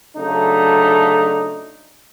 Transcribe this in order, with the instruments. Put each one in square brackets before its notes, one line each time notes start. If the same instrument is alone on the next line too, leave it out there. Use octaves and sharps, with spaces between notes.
[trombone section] C#3 F#3 A3 D4 D#4